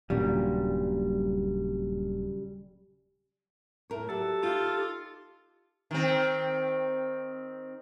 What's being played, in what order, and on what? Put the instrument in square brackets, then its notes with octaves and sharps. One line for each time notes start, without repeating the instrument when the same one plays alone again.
[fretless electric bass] D#1 G2 A#2 [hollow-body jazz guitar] C#3 F#3 G3
[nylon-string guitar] A2 A#4 C#5
[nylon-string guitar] F#3 F#4 [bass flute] G4 [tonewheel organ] A4
[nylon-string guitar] D#4 [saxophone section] F4
[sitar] D#3 C4